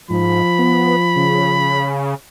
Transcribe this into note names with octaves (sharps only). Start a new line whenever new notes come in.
G#2 F3 B5
B3
C#3